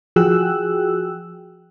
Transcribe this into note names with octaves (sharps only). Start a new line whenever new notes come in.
F3 F#4 G#4 G5 E6 F#6